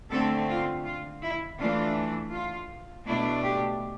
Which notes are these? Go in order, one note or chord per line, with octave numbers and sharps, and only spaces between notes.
D3 A3 C4 A4
F4
F4
E4
E3 A3 D4 F4
F4
B2 A3 D4 E4
G4